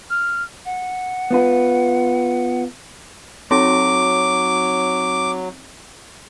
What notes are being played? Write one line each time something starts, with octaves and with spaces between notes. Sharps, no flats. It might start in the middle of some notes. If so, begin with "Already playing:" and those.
F6
F#5
B3 F4 B4
F#3 C4 D#4 C#5 D6